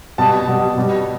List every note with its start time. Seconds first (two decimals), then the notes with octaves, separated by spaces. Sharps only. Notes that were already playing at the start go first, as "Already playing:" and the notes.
0.18 B2 G3 A5
0.47 B2 G3
0.77 B2 G3